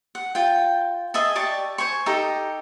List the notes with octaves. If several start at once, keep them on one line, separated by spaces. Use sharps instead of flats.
F#5
F4 G5
G#4 D#5 E5 A5
G4 D5 A5 C#6
C5 G#5 C#6
D#4 G4 A4 A#5